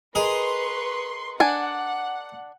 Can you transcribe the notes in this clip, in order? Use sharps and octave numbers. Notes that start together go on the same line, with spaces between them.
G#4 A#4 B4 D#5 C6 C#6
D4 F#5 G#5